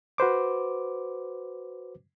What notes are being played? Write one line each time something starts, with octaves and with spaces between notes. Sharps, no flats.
F#4 B4 C5 D6